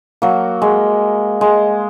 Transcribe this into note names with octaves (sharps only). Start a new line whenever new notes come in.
F#3 A#3
G#3
G#3